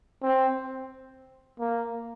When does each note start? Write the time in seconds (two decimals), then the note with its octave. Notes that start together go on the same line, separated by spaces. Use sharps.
0.23 C4
1.60 A#3